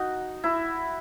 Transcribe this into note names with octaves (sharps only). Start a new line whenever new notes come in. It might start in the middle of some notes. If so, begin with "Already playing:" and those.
Already playing: D#4 F#4
E4